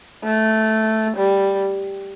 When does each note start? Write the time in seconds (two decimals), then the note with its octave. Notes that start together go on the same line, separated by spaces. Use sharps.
0.24 A3
1.17 G3